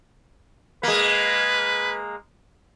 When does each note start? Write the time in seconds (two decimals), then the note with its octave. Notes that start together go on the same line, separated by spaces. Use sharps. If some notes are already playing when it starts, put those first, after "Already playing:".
0.83 G#3 A#3 B4